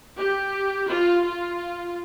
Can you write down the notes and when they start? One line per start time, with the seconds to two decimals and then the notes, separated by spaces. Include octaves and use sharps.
0.18 G4
0.90 F4
1.26 F4